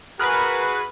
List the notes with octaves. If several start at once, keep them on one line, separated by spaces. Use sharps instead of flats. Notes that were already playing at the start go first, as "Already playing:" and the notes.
F#4 G#4 A#4 B4 B5 F6 F#6